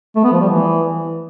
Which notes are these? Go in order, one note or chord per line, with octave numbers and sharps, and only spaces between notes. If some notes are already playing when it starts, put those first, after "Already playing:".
A3
B3
F3
G3
E3